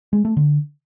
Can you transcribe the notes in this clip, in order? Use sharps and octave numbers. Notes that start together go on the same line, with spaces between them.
G#3
A3
D3